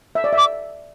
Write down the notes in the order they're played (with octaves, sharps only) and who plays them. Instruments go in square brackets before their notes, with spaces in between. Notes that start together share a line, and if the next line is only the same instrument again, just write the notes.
[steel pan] E5
D5
E5
[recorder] D6